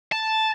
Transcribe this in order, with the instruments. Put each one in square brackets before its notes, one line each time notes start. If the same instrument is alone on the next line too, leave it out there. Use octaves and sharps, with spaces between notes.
[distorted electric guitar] A5